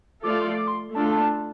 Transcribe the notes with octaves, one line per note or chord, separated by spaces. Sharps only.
F3 A3 F4 A4 D5 D6
C6
D6
C6
A3 D4 F4 A4 A5
A5